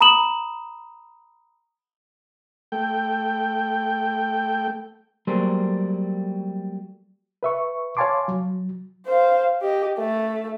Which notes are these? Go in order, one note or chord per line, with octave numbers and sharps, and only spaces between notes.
A#5 B5 D#6 E7 F#7
A3 G5
F#3 G3 A3 A#3 G#4 C5
B4 E5 C#6
C#5 F5 G#5 A5 C6 D6
F#3
C5 F5
G4 D#5
A3